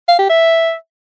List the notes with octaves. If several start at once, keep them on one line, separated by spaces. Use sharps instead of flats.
F5
G4
E5